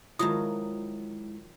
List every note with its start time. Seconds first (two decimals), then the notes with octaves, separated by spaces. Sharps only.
0.19 D#3 F3 F#3 G#3 E4 F4 D#6